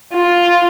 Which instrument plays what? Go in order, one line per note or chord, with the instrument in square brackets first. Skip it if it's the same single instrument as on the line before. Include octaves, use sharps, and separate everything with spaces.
[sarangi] F4